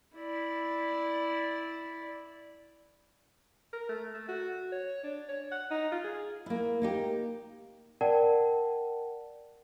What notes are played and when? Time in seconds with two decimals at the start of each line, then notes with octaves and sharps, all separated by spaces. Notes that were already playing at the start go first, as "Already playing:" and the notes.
0.15 E4 D5
3.73 A#4
3.89 A3
4.14 A3
4.29 F#4
4.72 C#5
5.03 D4
5.29 C#5
5.52 F#5
5.71 D#4
5.92 F4
6.04 G#4
6.46 A#3 E4
6.82 A#3 D#4 G4
8.01 A#4 D5 F#5 G5 A5